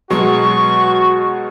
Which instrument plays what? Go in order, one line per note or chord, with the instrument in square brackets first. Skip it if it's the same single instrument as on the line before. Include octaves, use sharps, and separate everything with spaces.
[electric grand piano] B2 F#3 G#3 [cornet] F#4 [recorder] C#6